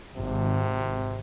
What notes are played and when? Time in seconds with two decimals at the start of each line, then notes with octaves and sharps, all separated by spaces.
0.17 G#1 C3